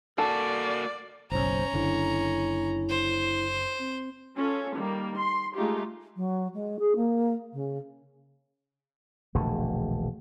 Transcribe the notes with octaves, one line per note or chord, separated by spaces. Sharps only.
A#3 F#4 A4 D5
F#1 B1 C#4 C5 A#5
F#1 D3 E4
C5
C4
C#4 F4 A4
D#3 G3 A#3
C6
G#3 A3 D#4 F4 G4
F#3
G#3
G#4
A#3
C#3
E1 A#1 D3 A3